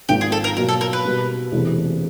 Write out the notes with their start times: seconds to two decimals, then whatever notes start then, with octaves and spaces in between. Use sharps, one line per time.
0.09 G#1 G#2 F3 A#3 G4
0.21 G#4
0.32 A4
0.44 A#4
0.57 B2 F#3 A#3 A#4
0.68 A4
0.81 A#4
0.93 B4
1.05 B2 G3 A#3
1.52 E1 E2 C3 E3 A3